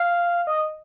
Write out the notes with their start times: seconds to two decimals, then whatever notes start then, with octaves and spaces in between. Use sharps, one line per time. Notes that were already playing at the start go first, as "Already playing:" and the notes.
Already playing: F5
0.47 D#5